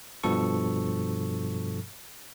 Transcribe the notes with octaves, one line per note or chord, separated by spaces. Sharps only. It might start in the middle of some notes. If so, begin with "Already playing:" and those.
G2 B2 F3 A4 C#6